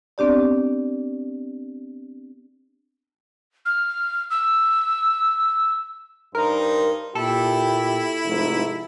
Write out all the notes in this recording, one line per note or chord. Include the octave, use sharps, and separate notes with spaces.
B3 C4 D4 G4 D5
F6
E6
G2 D#4 A#4 C5
A#2 E4 G4 A4
F1 G#2